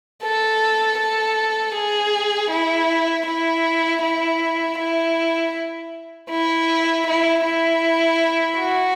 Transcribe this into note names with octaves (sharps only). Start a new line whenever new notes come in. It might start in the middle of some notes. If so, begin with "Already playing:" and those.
A4
A4
G#4
E4
E4
E4
E4
E4
E4
E4
F#4